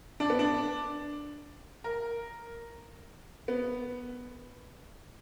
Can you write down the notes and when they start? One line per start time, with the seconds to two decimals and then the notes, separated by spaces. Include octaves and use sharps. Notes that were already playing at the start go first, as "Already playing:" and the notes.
0.20 D4
0.30 B3
0.39 D4
1.84 A#4
3.48 B3